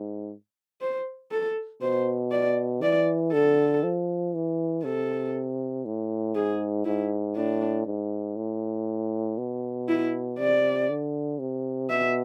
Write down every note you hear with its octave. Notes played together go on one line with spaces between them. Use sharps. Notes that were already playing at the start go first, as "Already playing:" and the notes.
Already playing: G#2
C5
A4
B2 C5
D5
E3 D5
D3 A4
F3
E3
C3 A4
A2
G#2 G#4
G#2 E4
A2 D4
G#2
A2
B2
E4
C3 D5
D3
C3
B2 E5